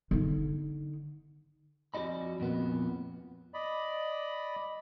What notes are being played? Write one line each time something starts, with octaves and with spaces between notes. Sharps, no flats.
D3 D#4
F2 F#4 D5 D#5 B5
F2 A#2 B3
D5 D#5 B5